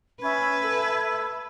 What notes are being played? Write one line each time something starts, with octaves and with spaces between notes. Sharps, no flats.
C#4 B4 E5 B5 G#6
A4